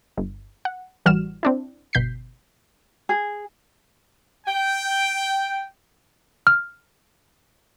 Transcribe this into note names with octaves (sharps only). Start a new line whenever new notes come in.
G1
F#5
A1 E3 G3 F#4 F6 E7
C4 D4 E4
G1 B2 G6 B6 C7
G#4
G5
F6